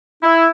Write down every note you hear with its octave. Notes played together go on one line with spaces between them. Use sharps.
E4